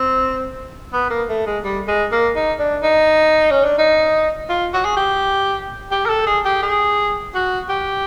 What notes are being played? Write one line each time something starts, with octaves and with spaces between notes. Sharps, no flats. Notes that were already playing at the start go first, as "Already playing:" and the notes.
Already playing: C4
B3
A#3
A3
G#3
G3
G#3
A#3
D#4
D4
D#4
C#4
D4
D#4
F4
F#4
G#4
G4
G4
A#4
A4
G#4
G4
G#4
F#4
G4